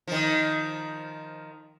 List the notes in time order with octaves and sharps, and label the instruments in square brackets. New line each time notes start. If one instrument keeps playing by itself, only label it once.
[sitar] D#3 F3